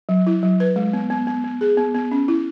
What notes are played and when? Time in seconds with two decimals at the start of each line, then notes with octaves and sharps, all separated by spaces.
0.09 F#3
0.27 E4
0.43 F#3
0.60 B4
0.76 G#3
0.93 B3
1.10 B3
1.27 B3
1.44 B3
1.61 G#4
1.77 B3
1.94 B3
2.12 C#4
2.28 E4